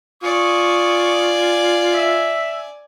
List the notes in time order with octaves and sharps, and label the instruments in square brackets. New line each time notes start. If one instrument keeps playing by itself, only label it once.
[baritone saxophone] F4 [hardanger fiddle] D5 G#5 [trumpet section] C#6 D#6
[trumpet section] E5